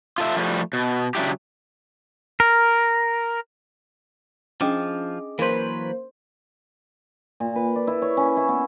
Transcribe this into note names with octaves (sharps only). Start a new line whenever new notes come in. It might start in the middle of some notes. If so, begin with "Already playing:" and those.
F4 A4 E5
F3 G3 A3
B2
C#3 F#3 D4 E4 G4
A#4
F3 C#4 D4 G#4 D#5 G5 D6
E3 F#3 A#3 B4 C5
A#2
B4
D5
E4
C#5
C#4
E4
B3